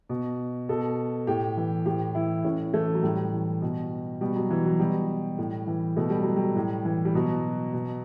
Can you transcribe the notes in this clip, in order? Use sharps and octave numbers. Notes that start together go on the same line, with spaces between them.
B2
B2 A4
A2 G4
E3
A2 G4
E3 E4
A2 C#4
E3 A3
F#3
A2 G3
E3
B2
B2 G3
F#3
E3
F#3
B2 G3
A2
E3
B2 A3
G3
F#3
G3
A2
E3
G3
B2 F#3
B2